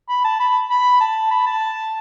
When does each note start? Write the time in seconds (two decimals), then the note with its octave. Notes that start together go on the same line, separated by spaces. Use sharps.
0.09 B5
0.24 A5
0.40 B5
0.71 B5
1.00 A5
1.31 B5
1.46 A5